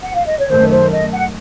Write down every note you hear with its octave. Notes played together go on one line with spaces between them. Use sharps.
F#5
F5
D#5
C#5
F#2 D#3 A3 C5
C5
D#5
F#5